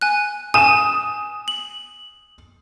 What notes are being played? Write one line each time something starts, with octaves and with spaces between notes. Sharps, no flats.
G#5 F#6
G#5 D#6 E7
F#7